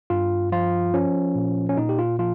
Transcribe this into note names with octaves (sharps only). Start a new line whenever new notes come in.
G2 F4
F3 F4
F3 C#4
A#2
C#4
A#2 D#4
G4
F4
F3 F4